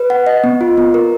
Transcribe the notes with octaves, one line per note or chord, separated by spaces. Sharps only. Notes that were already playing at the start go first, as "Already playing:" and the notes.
Already playing: B4
F#5
D#5
B3
F4
B3
A#4